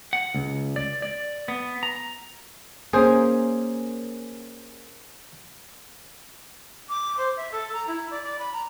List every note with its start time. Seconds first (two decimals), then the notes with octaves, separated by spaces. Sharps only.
0.13 F#5
0.34 C#2
0.76 D5
1.02 D5
1.48 B3
1.83 A#5
2.93 A#3 C#4 G#4 A#4 C5
6.89 D6
7.18 C5
7.37 E5
7.52 A4
7.73 A#5
7.87 E4
8.11 D5
8.23 D5
8.39 B5
8.53 A#5